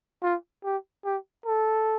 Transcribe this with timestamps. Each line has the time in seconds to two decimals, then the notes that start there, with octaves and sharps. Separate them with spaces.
0.23 F4
0.64 G4
1.05 G4
1.46 A4